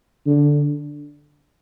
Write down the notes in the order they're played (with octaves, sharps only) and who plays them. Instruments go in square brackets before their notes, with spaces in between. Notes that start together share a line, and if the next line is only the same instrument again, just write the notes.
[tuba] D3